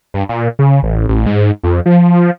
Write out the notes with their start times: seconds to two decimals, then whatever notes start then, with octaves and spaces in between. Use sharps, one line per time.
0.14 G2
0.29 A#2
0.59 C#3
0.83 A1
1.09 A1
1.26 G#2
1.63 F2
1.86 F3